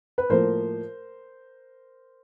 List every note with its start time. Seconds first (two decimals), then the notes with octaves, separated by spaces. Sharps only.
0.18 B4
0.29 A2 F3 A#3 A#4 C5